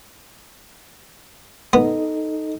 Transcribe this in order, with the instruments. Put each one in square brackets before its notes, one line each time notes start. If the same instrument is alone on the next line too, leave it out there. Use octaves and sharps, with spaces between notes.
[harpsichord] B3 [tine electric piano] D#4 A4 D#5